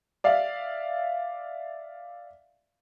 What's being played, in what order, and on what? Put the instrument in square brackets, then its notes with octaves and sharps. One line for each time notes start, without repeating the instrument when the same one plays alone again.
[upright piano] D5 E5 F5